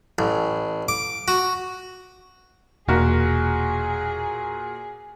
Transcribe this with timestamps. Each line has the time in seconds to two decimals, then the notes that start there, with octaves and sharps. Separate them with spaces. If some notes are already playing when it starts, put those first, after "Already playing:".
0.19 A1
0.88 D6
1.28 F#4
2.88 E1 A#2 F#4 G#4 A#4